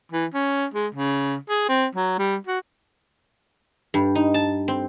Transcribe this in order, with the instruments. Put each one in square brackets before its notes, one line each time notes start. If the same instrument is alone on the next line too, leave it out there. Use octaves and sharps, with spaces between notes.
[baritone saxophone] E3
C#4
G#3
C#3
G#4
C4
F#3
G3
F#4
[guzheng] G2
D#4
A5
C4